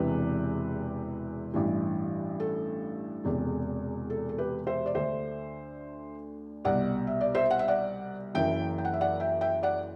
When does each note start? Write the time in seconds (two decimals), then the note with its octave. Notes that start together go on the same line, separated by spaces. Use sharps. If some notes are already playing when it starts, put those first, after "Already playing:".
Already playing: E1 E2 C3 E3 G4 B4
1.54 A1 G2 E3
2.40 A4
3.24 E1 E2 C3
4.10 A4
4.29 A4
4.38 G4 B4
4.67 C5 E5
4.86 D5
4.95 D2 D3 C5 E5
6.65 C2 B2 D5 F#5
7.07 E5
7.21 D5
7.35 C5 E5
7.50 F#5
7.59 E5
7.68 D5 F#5
8.34 F#1 F#2 E3 E5 G5
8.78 G5
8.85 F#5
8.93 E5
9.01 D5 F#5
9.20 E5 G5
9.41 E5 G5
9.63 D5 F#5